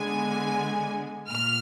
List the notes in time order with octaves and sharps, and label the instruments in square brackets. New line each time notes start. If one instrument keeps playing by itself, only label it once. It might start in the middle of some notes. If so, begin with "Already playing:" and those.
Already playing: [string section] D3 G#3 B3 G#5
A#2 F6